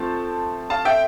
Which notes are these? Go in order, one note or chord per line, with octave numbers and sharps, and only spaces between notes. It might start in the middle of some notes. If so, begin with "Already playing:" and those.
Already playing: F3 A3 C4 C5 A5
F5 A5
E5 G5